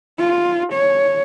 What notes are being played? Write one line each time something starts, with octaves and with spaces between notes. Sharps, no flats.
F4
C#5